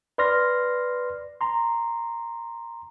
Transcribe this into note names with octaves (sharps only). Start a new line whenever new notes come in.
B4 D5 C6 F6 A#6
A#5 C6